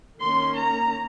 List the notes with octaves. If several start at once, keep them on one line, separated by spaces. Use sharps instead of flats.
D#3 A#3 C#4 C6
A#5